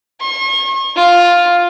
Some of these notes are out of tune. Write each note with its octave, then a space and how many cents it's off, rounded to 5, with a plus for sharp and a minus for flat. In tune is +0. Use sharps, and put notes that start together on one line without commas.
C#6 -45
F4 +5